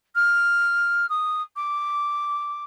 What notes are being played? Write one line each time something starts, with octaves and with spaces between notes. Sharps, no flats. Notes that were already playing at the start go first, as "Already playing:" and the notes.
F6
D#6
D6